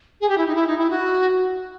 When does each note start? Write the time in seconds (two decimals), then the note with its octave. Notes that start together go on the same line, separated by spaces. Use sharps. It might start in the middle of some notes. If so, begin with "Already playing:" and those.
0.21 G#4
0.29 G4
0.38 E4
0.47 D#4
0.55 E4
0.67 D#4
0.78 E4
0.90 F#4